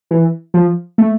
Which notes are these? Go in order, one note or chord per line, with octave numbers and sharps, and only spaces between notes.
E3
F3
A3